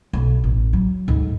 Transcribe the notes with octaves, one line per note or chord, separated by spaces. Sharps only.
B1
A1
F#3
D2 G#2